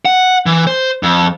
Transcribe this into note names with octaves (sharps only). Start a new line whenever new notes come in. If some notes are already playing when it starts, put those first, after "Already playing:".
F#5
E3
C5
F2